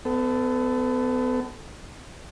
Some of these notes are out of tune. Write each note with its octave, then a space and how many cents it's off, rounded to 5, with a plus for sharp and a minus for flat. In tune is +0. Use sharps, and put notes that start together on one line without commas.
B3 +35 A4 +0